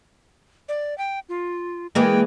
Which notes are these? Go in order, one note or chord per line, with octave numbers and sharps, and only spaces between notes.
D5
G5
F4
E3 G#3 A#3 G5